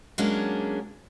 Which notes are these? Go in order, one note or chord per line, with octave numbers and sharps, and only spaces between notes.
F#3 G#3 A#3 C#4 D4